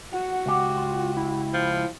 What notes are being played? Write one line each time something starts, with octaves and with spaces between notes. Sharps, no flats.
F#4 F#5
C#2 G4
F4
E4
F3